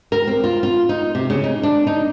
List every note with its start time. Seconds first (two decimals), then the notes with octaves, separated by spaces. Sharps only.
0.12 A#4
0.27 C4
0.44 F4
0.63 F4
0.89 D#4
1.15 C3
1.30 C#3
1.44 D#4
1.63 D4
1.87 D#4